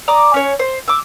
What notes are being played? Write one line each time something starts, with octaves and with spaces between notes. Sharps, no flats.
D5 A#5 D6 D#6
C#4 C#5
C5
E5 D6